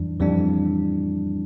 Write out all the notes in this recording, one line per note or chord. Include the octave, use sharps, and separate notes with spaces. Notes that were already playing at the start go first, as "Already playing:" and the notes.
Already playing: F2 E3 G3 D4
F2 E3 G3 D4